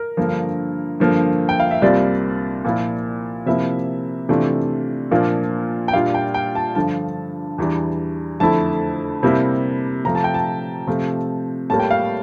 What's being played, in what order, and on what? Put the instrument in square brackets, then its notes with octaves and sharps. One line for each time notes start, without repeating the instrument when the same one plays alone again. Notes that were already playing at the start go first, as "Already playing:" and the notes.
Already playing: [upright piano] A#4
G2 D3 F3 A#3
G2 D3 F3 A#3
G5
F5
E5
C2 C3 G3 A#3 F4 D5
A#2 F3 A#3 E4
C3 F3 A#3 E4 E5
C3 E3 A3 D4 F4
A#2 F3 A#3 D4 F4
G5
A#2 G3 D4 F4 F5
G5
G5
A5
G2 D3 F3 A5
E2 E3 G3 D4
F2 D3 A3 E4 A5
C3 G3 A#3 E4
C3 F3 A3 A#5
A5
G5
A5
C3 F3 A3 C4
A2 G3 A#3 A5
G5
F5